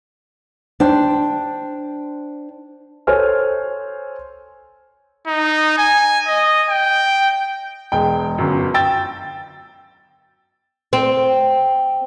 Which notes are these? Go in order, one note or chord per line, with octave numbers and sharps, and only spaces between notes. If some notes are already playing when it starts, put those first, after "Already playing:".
D4 C5 G5
A4 C5 C#5 G#5 F6
D#4
G#5
D#5
G5
E1 G#3 G5
G1 F#2
G5 E6 A6
C4